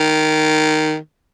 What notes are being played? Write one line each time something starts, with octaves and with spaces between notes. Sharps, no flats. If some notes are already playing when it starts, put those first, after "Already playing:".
Already playing: D#3